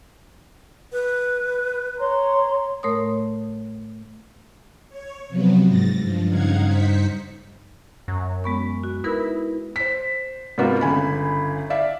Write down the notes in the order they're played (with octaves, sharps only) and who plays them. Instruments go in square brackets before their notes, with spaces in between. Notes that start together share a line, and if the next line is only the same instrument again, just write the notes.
[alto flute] B4
[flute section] C#5 A#5 C6
[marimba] A2 A3 A#4 C#5 C6 D#6
[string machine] C#5
C3 F3 F#3 B3
G#2 A6 A#6
G2 F3
G2 C#3 D#4 F5 F#5 G#6
G2 D#4 C5 B6 C#7
[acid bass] F#2
[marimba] G#3 B3 C#6
F#4
[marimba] D#4 A#4 B4 [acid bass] E4
[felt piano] C5 B6
G#2 C3 A#3 B3 F4 F#4
G1 C#3 G#5 B5
D5 E5 F5